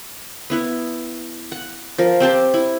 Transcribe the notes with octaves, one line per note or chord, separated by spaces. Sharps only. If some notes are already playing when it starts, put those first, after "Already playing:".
B3 E4 B4
F#5
F3 A#4
C4 G4 C5 A5
E4